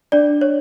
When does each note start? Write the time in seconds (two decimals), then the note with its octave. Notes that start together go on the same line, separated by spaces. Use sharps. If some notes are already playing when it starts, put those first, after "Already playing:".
0.12 D4 D5
0.41 C#5